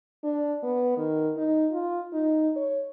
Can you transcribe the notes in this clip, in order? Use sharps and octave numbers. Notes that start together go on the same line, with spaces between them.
D4
B3
D#3
D#4
F4
D#4
C#5